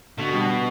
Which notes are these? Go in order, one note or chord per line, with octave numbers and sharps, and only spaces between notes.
B2 D3
G3 D4 F#4